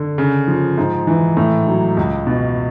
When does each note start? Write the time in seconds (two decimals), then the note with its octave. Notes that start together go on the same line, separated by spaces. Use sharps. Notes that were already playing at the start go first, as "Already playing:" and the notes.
Already playing: D3
0.18 C#3
0.48 F3
0.78 G#2
1.07 E3
1.37 A2
1.67 F#3
1.97 C#2
2.27 B2